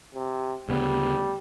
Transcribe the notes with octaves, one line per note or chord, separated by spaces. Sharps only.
C3
D2 C#3 G3 B3